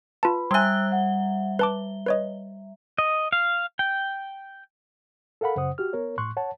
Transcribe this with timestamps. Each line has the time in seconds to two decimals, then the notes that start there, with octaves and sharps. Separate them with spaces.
0.23 F4 B4 A5 B5
0.51 G3 E5 G5 G#5 C6 E6 F#6
0.92 F#5
1.59 B4 A5 D6 G7
2.06 B4 C#5 D#5
2.98 D#5
3.33 F5
3.79 G5
5.41 A4 A#4 F5 F#5 B5
5.56 F#2 C#3 C5 F#5 D#6
5.78 F#4 G4 F6
5.93 B3 A#4 C#5
6.18 A2 C6 C#6 F#6
6.37 C#5 F#5 A5